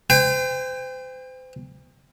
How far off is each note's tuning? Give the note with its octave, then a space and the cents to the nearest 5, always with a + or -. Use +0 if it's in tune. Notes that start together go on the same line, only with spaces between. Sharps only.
C5 -35 G5 +35